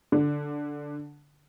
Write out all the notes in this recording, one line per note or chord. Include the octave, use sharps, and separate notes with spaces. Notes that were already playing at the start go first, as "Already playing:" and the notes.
D3